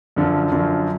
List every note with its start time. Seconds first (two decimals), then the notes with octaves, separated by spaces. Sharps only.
0.16 F#2 D3 F3
0.52 F#2 D3 F3